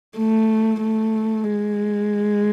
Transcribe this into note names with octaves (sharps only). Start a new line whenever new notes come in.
A3
A3
G#3